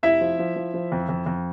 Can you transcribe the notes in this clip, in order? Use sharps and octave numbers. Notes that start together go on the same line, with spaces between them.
F1 E4 E5
F3
F3
F3
F3
F2
F2
F2